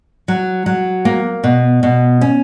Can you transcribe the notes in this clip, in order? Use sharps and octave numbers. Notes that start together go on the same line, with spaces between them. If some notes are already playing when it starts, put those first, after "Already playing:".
F#3
F#3
A#3
B2
B2
C#4